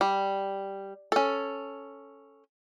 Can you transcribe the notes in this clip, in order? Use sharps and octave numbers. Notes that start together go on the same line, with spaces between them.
G3
C#4 A4